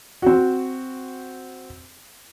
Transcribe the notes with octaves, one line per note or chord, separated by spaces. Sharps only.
C4 F#4